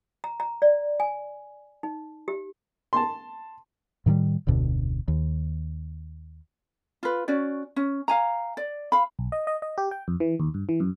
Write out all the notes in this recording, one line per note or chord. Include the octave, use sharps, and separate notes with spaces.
A#5
A#5
D5
G#5
D#4
G4
A5 C6
A2 D#3 F3 G3
F1 D2 B2 D3
D#2
F4 B4
C#4 F#4 D5
C#4
F5 G#5 A#5
D5
F5 B5
B1
D#5
D#5
D#5
G4
G5
F2
E3
D#2
G2
E3
F#2